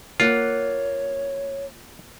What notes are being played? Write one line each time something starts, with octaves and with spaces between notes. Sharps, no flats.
A#3 F4 C#5 F#5